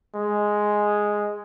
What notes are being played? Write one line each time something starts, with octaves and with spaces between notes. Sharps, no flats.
G#3